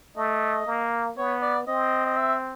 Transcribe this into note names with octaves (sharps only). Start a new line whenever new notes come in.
A3 D#5
A#3
B3 C#5
D5
C4 D#5
D#5
E5